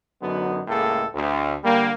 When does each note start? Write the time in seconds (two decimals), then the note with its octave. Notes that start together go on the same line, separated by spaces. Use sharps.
0.21 F#2 D3 F#3 B3 D#4
0.68 C#2 A2 G#3 A#3 A4
1.14 D2
1.64 D3 G3 A#3